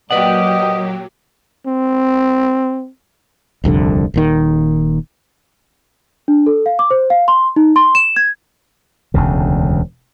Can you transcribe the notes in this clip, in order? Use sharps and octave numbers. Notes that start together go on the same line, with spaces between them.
A#2 F#3 A#3 G4 B4 D5 D#5 F#5
C4
D#1 C2 F2 D3
D#1 D#2 D#3
D4
A4
F5
D6
C5
F5
C6
D#4
C6
E7
G#6
E1 D2 C#3